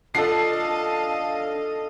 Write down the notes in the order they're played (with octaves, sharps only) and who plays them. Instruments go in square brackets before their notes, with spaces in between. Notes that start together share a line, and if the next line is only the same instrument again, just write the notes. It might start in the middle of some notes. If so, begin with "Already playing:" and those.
[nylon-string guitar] D4 F4 F#5 [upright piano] A4 C7 [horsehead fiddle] D#5 F5 [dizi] A5